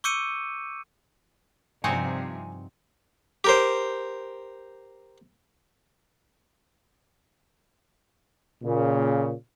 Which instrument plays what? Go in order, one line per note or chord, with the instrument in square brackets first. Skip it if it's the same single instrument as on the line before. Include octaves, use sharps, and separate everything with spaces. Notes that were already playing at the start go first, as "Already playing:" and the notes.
[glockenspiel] C#6 D6 E6 G6 C#7 D#7
[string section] G2 C3 F3 [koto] C4 D#4 F#4 [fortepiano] G#5
[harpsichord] G4 A#4 C5
[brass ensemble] A#2 C#3